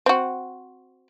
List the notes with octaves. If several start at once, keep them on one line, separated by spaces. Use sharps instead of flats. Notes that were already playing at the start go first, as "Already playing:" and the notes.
C4 F#4